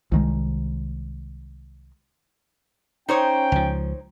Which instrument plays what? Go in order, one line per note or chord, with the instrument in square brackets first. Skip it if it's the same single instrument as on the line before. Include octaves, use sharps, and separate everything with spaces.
[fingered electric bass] C2 D#3 G#3
[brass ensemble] C#4 G5 [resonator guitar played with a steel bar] D#4 C5 C#5
[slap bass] C#2 F3